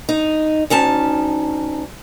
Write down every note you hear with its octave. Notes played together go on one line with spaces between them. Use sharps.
D#4
D2 C#4 D#4 A5